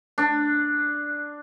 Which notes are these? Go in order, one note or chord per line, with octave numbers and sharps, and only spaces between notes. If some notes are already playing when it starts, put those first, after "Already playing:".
D4